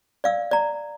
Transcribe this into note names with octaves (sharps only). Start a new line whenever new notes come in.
D5 F5 E6
D5 A#5